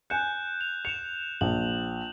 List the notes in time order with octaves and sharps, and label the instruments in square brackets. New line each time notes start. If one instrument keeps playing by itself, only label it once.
[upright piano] G#5 C#7 [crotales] F#6 G6 E7
[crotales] F7
[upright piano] C#7 [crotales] E7 F7
[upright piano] A#1 [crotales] F#7